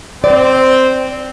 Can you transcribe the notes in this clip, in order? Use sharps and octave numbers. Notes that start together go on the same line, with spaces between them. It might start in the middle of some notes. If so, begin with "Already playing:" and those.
C4 D5